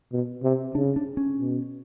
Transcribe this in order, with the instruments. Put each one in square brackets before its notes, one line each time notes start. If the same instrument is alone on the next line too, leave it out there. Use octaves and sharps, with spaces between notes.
[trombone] B2
C3
[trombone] C#3 [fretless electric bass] D4
[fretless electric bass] D4
C#4
[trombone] B2